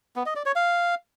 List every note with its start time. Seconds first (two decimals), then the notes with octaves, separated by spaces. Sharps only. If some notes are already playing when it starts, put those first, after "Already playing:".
0.16 B3
0.26 D#5
0.36 D5
0.46 C#5
0.56 F5